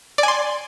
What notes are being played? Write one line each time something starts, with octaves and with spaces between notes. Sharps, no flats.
D5 G#5 C6